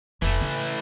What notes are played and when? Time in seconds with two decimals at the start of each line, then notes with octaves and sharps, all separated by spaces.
0.22 F1 E3 A3
0.41 C#3